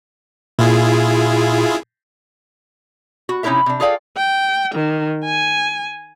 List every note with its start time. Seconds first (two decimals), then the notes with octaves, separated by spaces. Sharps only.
0.59 A#2 E4 F4 G#4
3.29 F#4
3.43 C3 C#4 D#4 E4 A#4 E5
3.66 C3 D4
3.80 F4 G#4 A4 D5 F5 G5
4.17 G5
4.75 D#3
5.25 G#5